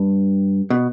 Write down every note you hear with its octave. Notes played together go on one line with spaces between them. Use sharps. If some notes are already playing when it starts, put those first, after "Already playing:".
Already playing: G2
B2